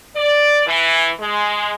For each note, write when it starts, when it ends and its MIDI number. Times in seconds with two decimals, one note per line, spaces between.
0.16 0.61 74
0.67 1.10 52
1.20 1.74 56